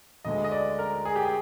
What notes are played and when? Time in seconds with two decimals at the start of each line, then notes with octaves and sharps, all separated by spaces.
0.25 D2 D3 G#3 D#5
0.44 D#5
0.52 D5
0.79 A#4
1.05 G#4
1.16 G4
1.25 G#4